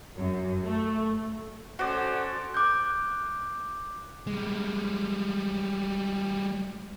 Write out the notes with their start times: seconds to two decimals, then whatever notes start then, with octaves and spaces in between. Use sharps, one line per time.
0.17 F#2
0.65 A3
1.79 C#4 F#4 A4 C5 D5
2.54 D6 F#6 G6
4.27 G3 G#3